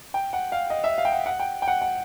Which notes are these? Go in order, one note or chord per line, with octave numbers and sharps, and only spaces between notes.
G5
F#5
F5
D#5
E5
F5
G5
F#5
F#5
G5
G5
F#5
F#5